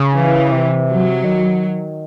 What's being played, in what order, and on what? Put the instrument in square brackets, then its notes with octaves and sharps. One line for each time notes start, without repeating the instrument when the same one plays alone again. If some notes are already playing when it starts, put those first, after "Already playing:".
Already playing: [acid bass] C#3
[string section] E3
[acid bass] C3
[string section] F#3
[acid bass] D#3